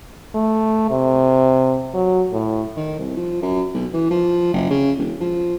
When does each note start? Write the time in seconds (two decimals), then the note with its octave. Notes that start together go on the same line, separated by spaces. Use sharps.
0.34 A3
0.90 C3
1.94 F#3
2.32 A2
2.76 D#3
2.99 C2
3.16 F3
3.42 F#2
3.74 B1
3.93 E3
4.10 F3
4.53 F#1
4.70 C#3
4.97 E1
5.20 F3